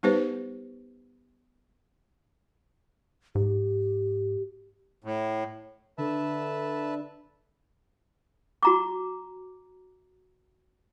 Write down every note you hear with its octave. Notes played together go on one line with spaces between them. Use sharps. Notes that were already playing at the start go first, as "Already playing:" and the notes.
G3 B3 D#4 G4 B4 C5
G#2 G4
A2
D3 B4 E5 A5
F#4 A#5 D6